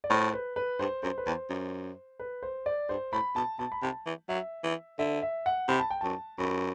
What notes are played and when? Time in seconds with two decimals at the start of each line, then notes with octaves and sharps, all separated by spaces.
0.04 D5
0.10 A2 C5
0.33 B4
0.56 B4
0.79 G2 C5
1.03 F#2 C5
1.18 B4
1.27 E2 C5
1.50 F#2
2.19 B4
2.43 C5
2.66 D5
2.89 G2 C5
3.13 A2 B5
3.36 B2 A5
3.59 B2 A5
3.72 B5
3.82 C3 A5
4.06 E3
4.29 F#3 E5
4.64 E3
4.99 D3 E5
5.22 E5
5.46 F#5
5.68 C3 B5
5.80 A5
5.90 G5
6.01 F#2 A5
6.38 F#2 B5